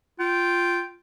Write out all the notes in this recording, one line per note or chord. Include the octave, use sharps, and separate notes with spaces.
F4 G5